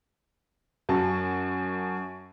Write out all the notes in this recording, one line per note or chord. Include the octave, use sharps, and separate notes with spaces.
F#2 F#4 A5